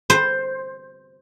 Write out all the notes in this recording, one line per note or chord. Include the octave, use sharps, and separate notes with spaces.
C5